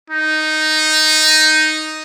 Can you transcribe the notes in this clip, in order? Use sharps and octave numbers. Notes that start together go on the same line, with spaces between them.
D#4